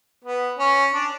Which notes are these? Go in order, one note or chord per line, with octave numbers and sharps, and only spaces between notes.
B3
C#4
D4